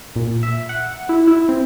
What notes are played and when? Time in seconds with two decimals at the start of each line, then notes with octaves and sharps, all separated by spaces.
0.16 A#2
0.43 E5
0.69 F#5
1.09 E4
1.27 E4
1.49 C4